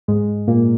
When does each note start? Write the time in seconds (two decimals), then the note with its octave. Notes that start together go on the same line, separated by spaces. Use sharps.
0.08 G#2 G#3
0.47 A#2 A#3